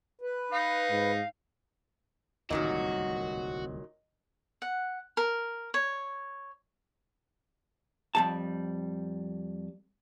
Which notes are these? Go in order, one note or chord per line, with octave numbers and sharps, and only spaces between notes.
B4
D#4 F5
G#2
D1 C2 A#2 D#3 F#3 G3 F#4 D#5
F#5
A#4
C#5
F2 G3 A5